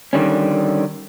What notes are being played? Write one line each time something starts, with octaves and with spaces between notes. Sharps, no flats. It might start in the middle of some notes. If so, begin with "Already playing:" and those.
D3 D#3 G3 C#4